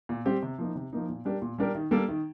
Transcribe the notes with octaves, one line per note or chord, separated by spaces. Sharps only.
A#2
G3 C4 G4
C3
F3 A#3 D#4
C3
F3 A#3 D#4
A#2
G3 D4 G4 A#4
A#2
G3 D4 G4 A#4
D#3
G3 A#3 D4 A4
D#3